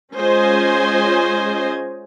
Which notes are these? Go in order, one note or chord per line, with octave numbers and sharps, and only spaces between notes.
G#3 C#4 F4 C5 D#5 G#5